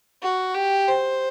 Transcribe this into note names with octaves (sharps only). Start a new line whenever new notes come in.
F#4
G4
C5